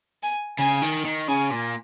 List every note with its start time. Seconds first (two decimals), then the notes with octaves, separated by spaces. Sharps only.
0.23 G#5
0.58 C#3 G#5
0.82 D#3
1.05 D#3
1.28 C#3 G#5
1.51 A#2